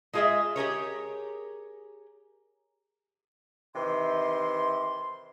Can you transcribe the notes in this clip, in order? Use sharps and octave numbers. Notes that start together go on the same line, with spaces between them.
G#3 F4 G#4 C#5 D#5 E5
G4 G#4 A#4 C#5
C3 D#3 E3 C6